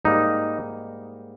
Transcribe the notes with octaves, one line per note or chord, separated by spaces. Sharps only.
G#2 G3 A#3 D#4